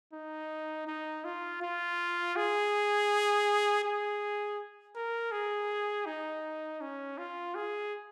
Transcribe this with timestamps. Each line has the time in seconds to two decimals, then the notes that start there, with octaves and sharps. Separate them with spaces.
0.13 D#4
0.87 D#4
1.24 F4
1.62 F4
2.36 G#4
3.84 G#4
4.96 A#4
5.32 G#4
6.06 D#4
6.81 C#4
7.18 F4
7.55 G#4